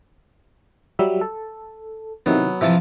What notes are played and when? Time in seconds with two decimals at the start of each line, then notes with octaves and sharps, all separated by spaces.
0.99 F#3 G3 E5
1.21 A4
2.26 C3 D#3 F#3 B3 E4
2.61 C3 E3 F3 E5 A6